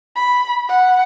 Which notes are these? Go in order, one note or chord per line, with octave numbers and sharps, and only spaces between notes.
B5
F#5